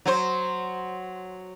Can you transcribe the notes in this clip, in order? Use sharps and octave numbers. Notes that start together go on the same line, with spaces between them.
F#3 C5